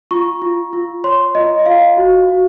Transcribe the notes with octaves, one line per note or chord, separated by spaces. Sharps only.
F4 C#6
F4
F4
C#5 C6
F4 D#5
D#5
F4 F5
F#4
F#4